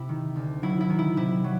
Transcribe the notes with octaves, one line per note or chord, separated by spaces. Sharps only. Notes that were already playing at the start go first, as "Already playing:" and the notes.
Already playing: C3 E4
D#3
D2
F#3 E4
E4
D#3
E4
C3 E4
F#3